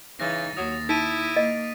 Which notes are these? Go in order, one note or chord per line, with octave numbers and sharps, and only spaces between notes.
C#3 E3 D#4 A6 A#6
D#2 F#3 D#6
D#4 E4 B6 D7 D#7
A#3 D#5